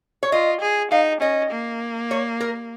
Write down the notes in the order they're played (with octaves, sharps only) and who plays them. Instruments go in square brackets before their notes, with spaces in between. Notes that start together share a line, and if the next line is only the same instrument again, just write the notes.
[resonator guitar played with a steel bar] C#5
[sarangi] F4 [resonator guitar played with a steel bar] D#5
[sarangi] G#4
[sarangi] D#4 [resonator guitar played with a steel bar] F5
[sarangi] C#4 [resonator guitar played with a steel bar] D#5
[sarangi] A#3
[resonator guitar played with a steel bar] C#5
A#4